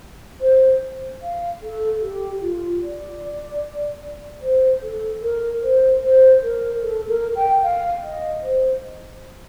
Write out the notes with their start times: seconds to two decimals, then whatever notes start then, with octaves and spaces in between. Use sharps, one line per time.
0.41 C5
1.22 F5
1.62 A4
2.01 G4
2.42 F4
2.82 D5
4.42 C5
4.83 A4
5.22 A#4
5.62 C5
6.03 C5
6.43 A#4
6.83 A4
7.09 A#4
7.36 G5
7.63 F5
8.03 D#5
8.42 C5